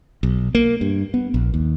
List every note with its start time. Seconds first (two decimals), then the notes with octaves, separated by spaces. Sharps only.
0.23 B1
0.55 A#3
0.81 G2
1.14 B3
1.34 A#1
1.54 D#2